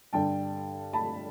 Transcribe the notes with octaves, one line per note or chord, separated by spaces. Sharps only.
G2 D3 G3 G5 A5
A5 B5